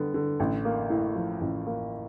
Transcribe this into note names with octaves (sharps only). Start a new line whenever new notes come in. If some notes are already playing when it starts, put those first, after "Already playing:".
Already playing: D3 G3 B3
D3
A1
A#3
A2
F3
A1
A#3